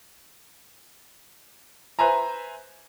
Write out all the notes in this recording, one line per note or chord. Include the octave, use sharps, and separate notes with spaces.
B4 C5 E5 G#5 A#5